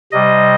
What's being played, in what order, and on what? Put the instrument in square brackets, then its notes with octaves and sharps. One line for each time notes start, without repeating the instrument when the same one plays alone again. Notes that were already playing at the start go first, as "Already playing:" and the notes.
[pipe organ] C3 G3 D#5